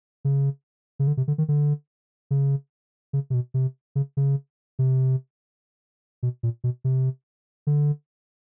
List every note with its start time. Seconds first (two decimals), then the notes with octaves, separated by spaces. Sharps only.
0.25 C#3
0.99 C#3
1.07 D3
1.17 C3
1.28 D3
1.38 D#3
1.48 D3
2.31 C#3
3.13 C#3
3.30 C3
3.34 B2
3.54 C3
3.95 C#3
4.17 C#3
4.79 C3
6.23 B2
6.43 A#2
6.64 B2
6.84 C3
7.67 D3